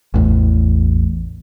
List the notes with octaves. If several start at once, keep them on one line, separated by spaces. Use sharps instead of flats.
A1 E2 A2